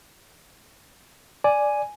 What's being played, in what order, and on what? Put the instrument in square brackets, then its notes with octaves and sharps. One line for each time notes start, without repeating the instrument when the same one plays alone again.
[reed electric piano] D5 [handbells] G#5